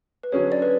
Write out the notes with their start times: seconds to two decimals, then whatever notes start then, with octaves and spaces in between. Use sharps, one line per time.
0.23 B4
0.32 D3 F#3 C#4 G#4 C#5
0.52 D5
0.62 B4